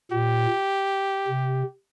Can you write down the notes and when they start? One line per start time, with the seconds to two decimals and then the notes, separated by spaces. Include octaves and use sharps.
0.12 A#2 G4
1.28 C3